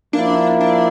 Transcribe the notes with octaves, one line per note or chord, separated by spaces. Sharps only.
F3 A#3 D4 E4
D4